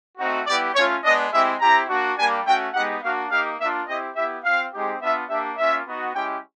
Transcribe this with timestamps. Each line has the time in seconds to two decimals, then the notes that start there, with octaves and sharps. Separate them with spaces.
0.18 A3 C4 D#4 F#4
0.46 G3 B3 E4 G4 D5
0.75 A3 C#4 F4 C#5
1.04 G#3 B3 D4 D#5
1.32 G#3 C4 E4 G4 E5
1.60 C4 E4 G4 A#5
1.89 A#3 D4 F#4
2.17 G3 A#3 D4 G4 G#5
2.46 A3 C#4 F#4 G5
2.74 G#3 B3 D#4 G4 F#5
3.02 A#3 D4 F#4 F5
3.31 A#3 D#4 G4 F5
3.59 A#3 D4 F4 E5
3.88 C4 E4 G4 D#5
4.16 B3 E4 G4 E5
4.44 C4 F4 F5
4.73 G#3 C4 D#4 G4
5.01 B3 D4 F4 E5
5.29 A#3 D4 G4 E5
5.58 A#3 C#4 F4 E5
5.86 B3 D#4 F#4
6.14 G#3 C#4 E4 G4 G5